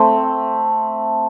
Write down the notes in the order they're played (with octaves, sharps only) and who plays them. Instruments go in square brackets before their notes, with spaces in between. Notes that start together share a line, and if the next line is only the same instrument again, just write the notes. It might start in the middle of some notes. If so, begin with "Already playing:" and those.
Already playing: [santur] A3 C4